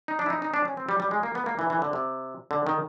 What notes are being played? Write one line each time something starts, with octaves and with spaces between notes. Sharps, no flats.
D#4
D4
E4
D#4
D#4
D4
C#4
C4
G3
G3
G#3
A#3
B3
A#3
E3
E3
D3
C3
D3
D#3